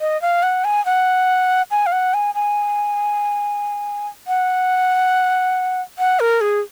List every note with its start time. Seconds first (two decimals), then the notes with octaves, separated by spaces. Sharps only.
0.01 D#5
0.22 F5
0.43 F#5
0.64 G#5
0.86 F#5
1.71 G#5
1.86 F5
1.92 F#5
2.14 G#5
2.35 G#5
4.27 F#5
5.99 F#5
6.20 A#4
6.41 G#4